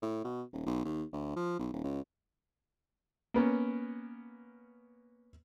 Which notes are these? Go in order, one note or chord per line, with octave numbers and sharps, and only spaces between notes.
A2
B2
D#1
B1
D#2
D2
F3
B1
D#1
C#2
A#3 B3 C#4